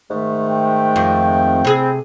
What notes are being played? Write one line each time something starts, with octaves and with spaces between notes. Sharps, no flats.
G#2 D#3 A3
G5
F2
C3 C4 E4 G#4